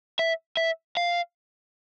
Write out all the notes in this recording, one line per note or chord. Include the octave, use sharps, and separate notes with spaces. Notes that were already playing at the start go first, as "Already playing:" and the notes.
E5
E5
F5